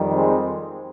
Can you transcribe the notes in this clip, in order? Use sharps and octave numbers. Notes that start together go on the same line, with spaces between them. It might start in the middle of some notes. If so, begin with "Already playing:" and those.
Already playing: F2 D#3 G3
G#3 C4